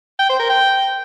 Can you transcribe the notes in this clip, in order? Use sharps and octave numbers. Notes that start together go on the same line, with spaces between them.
G5
C5
A#4
G5